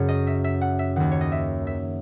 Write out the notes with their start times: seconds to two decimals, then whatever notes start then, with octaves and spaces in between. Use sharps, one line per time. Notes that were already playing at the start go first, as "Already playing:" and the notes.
Already playing: F#2 C#3 C#5
0.09 D#5
0.27 E5
0.44 E5
0.61 F#5
0.79 E5
0.96 D#2 D#3 F#5
1.12 C#5
1.21 D#5
1.32 E5
1.67 E5